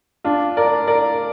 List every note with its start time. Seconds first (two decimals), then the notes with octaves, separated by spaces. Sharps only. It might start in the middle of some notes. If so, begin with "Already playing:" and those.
0.24 D4 F4
0.57 A#4 D5
0.87 A#4 D5